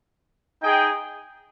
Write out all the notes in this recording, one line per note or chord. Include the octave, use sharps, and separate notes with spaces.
D#4 G#4 D#5 G5